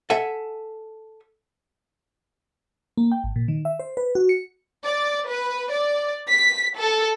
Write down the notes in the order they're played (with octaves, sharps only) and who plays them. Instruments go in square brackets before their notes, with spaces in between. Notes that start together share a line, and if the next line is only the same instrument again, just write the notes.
[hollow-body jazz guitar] A4 E5 F#5 G#5
[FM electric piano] A#3
G5
G#1
A#2
D#3
E5
C5
B4
F#4
C#7
[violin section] D5
B4
D5
B6
A4